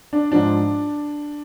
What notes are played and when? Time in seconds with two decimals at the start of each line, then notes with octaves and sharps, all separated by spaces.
0.13 D4
0.32 G#2 F3 D4